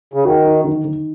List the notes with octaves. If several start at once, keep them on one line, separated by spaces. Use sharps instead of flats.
C#3
D#3 F#4
D#4
D#3
D#3